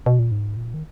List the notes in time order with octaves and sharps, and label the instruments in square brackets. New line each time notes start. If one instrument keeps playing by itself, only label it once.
[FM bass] B2
A#2
G#2
A#2
D#3